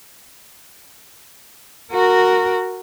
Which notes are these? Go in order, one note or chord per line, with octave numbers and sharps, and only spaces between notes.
F#4 A#4